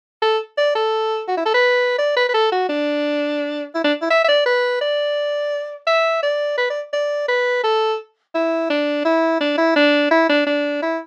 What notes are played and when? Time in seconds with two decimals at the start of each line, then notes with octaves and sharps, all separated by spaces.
0.22 A4
0.58 D5
0.75 A4
1.28 F#4
1.37 E4
1.46 A4
1.54 B4
1.98 D5
2.17 B4
2.29 B4
2.34 A4
2.52 F#4
2.69 D4
3.75 E4
3.85 D4
4.02 E4
4.11 E5
4.24 E5
4.28 D5
4.46 B4
4.81 D5
5.87 E5
6.23 D5
6.58 B4
6.70 D5
6.93 D5
7.28 B4
7.63 A4
8.35 E4
8.70 D4
9.05 E4
9.41 D4
9.58 E4
9.76 D4
10.11 E4
10.29 D4
10.46 D4
10.82 E4